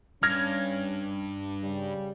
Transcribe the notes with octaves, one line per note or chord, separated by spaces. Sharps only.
G2 C#4 F6 G#6 A#6
C#3 G3